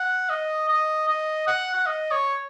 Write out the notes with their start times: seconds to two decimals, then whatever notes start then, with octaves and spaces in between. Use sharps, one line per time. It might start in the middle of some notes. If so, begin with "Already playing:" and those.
Already playing: F#5
0.30 D#5
0.69 D#5
1.08 D#5
1.47 F#5
1.74 F#5
1.86 D#5
2.12 C#5